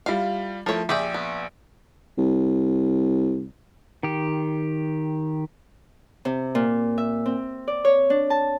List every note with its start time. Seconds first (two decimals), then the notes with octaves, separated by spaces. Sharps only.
0.06 G3 E4 F4 F5
0.66 F3 A3 E4 A#4 C#5
0.89 A#1 G4 G#4 E5 G5
1.14 B3
2.18 C2
4.03 D#3 G4
6.25 C3
6.55 A#2
6.98 E5
7.26 C4
7.68 D5
7.85 C#5
8.10 D4
8.30 A5